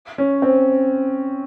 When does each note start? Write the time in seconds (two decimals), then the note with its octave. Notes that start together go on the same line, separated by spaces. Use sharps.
0.18 C#4
0.42 C4